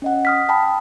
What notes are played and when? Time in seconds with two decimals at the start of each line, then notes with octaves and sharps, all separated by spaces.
0.02 C#4 D#5 F#5
0.25 D#6 F6 B6
0.49 G5 A5 B5 D#6